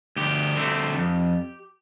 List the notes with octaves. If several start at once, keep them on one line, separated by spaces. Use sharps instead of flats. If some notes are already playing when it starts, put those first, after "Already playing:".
D2 G4
D3 A3 C4
F2